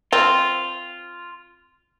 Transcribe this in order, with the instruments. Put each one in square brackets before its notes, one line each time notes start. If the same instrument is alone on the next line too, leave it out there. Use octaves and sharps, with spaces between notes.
[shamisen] C4 [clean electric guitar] F4